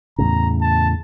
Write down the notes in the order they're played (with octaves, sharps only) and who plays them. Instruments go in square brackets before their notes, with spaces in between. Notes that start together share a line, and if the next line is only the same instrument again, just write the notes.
[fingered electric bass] E2 A2 C#3 [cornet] A#5
[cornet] A5